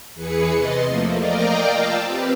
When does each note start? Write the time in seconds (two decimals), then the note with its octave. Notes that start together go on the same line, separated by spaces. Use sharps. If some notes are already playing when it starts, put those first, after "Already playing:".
0.15 E2 E3 G#4 B4 C#7
0.53 C3 D#5 C6 A6
0.85 F3 A3 A#3
1.17 A#4 D5 D#5 F5 G5 A#5
1.70 F4 F5 G5 A5 E6
2.02 C4 G4 B4